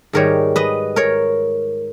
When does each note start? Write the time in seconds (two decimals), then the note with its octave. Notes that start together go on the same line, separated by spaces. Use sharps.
0.13 G#2 D#3 G3 A#4 C#5
0.56 B4 D#5
0.96 A#4 C#5